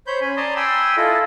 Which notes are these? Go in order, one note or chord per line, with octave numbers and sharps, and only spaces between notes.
C5 C#5 B5 G6
C#4 G#5 B5
D5 A5 A#5 C6 D#6
G5 G#5 B5 C6 D#6 E6
E4 F4 A4 D#5